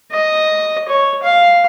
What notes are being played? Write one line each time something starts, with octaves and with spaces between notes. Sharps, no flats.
D#5
C#5
F5